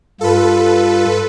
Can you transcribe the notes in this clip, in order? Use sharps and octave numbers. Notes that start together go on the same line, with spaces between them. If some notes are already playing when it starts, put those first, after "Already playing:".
G2 F4 A4 B4